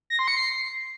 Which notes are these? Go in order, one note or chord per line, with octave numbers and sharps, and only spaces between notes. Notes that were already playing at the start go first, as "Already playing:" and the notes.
A#6
C6
C#7
C7